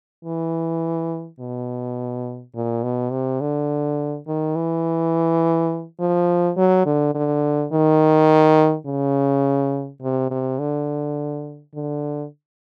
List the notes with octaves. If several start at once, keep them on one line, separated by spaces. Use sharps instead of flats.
E3
B2
A#2
B2
C3
D3
D#3
E3
F3
F#3
D3
D3
D#3
C#3
C3
C3
D3
D3